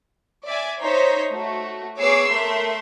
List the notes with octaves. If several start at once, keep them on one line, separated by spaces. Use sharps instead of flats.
D5 E5 G#5
D#4 C5 C#5 A#5 B6
A3 F#4
B3 G#4 C#5 D6 E6 C7
A3 A#4 E5 C6